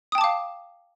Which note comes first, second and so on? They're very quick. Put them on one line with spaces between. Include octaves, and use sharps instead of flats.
D#6 G5 A5 D6 F5